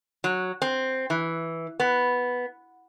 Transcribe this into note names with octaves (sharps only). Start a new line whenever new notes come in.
F#3
C4
E3
B3